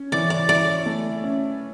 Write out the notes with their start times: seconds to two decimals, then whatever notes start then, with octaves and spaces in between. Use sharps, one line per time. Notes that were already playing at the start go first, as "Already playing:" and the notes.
Already playing: C#4
0.12 E3 D5
0.30 D5
0.49 E4 D5
0.86 A3
1.24 C#4